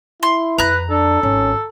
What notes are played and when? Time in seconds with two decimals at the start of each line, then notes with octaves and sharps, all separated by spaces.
0.23 E4 C6
0.58 F2 B4 A#5 F#6
0.90 D4 A4
1.23 G#1 C#4